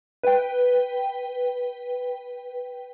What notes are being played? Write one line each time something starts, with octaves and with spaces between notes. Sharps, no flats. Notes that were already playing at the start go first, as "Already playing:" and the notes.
B4 G5